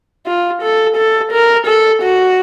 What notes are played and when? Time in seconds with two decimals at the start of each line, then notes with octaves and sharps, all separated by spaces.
0.27 F4
0.62 A4
0.97 A4
1.32 A#4
1.67 A4
2.02 F#4